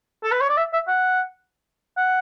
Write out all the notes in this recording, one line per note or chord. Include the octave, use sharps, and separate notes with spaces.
A4
B4
C#5
D5
E5
E5
F#5
F#5